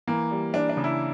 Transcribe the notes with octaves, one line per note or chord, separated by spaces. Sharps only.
E3 A#3
G3
E3 D4
D4
C#3
E4